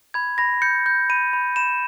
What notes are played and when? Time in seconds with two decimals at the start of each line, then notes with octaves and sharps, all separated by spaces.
0.14 B5 G#6
0.38 B5 A#6
0.62 G6 C#7
0.86 G6
1.10 B5 D#7
1.33 B5
1.56 B5 E7